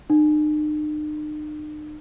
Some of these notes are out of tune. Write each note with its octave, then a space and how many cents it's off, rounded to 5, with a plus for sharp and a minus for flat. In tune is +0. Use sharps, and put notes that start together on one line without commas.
D#4 -45